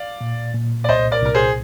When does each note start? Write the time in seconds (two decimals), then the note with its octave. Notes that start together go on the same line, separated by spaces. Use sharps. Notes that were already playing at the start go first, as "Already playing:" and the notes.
Already playing: D5 F5
0.21 A#2
0.54 A#2
0.84 D5
0.89 C2 C5 D#5
1.11 A#4 D5
1.23 C2 A#4
1.34 G#4 C5